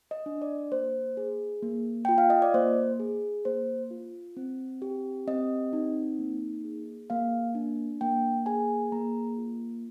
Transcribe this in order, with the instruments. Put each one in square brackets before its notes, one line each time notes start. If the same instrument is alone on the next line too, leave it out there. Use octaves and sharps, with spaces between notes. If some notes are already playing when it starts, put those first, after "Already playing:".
[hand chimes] D#5
D4
D5
A#3 C5
G#4
A#3
F4 G5
F5
D#5
D5
A#3 C5
G#4
A#3 C5
F4
C4
G4
C4 D#5
D#4
A#3
G#4
A#3 F5
D4
A#3 G5
G#4 G#5
A#3 A#5
F4